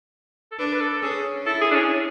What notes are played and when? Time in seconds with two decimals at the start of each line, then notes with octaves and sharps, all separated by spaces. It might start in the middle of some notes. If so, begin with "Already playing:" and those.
0.51 A4
0.59 D4 B4
0.72 B4
0.80 A4
0.93 A4
1.02 C#4 G#4
1.46 E4 A4
1.61 G#4
1.71 D4
1.75 C#4